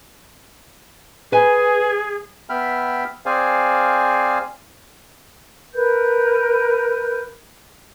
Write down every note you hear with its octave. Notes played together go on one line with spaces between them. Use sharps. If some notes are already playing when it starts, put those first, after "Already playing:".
G#4 B4 G#5
B3 E5 G5 B5 F6
C4 G#4 C5 D5 F5 G#5
A#4 B4 G6